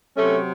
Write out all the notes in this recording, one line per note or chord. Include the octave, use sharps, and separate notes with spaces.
C3 F#3 A3 C#4